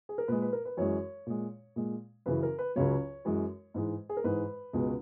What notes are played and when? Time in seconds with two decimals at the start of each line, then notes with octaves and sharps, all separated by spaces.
0.09 G#4
0.18 A#4
0.28 A#2 G#3 B4
0.42 B4
0.53 A#4
0.65 B4
0.77 F#2 E3 G#3 C#5
1.26 A#2 G#3
1.76 A#2 G#3
2.26 F#2 C#3 E3 B4
2.43 A#4
2.59 B4
2.76 C#2 C#3 F#3 C#5
3.25 F#2 E3 G#3
3.74 G#2 E3 G#3
4.09 G#4
4.17 A#4
4.24 G#2 E3 G#3 B4
4.73 C#2 B2 G#3